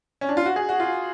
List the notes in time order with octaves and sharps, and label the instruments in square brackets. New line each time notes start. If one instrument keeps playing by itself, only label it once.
[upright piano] C#4
D4
F4
F#4
G#4
F#4
F4